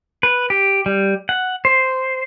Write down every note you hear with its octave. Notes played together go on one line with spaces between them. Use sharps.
B4
G4
G3
F#5
C5